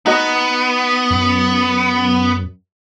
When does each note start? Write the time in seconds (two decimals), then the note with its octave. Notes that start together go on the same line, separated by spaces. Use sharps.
0.06 B3 D#4 F#4 D#5
1.10 F#2